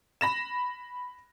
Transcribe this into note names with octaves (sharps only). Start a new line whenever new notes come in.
B5 A#6 E7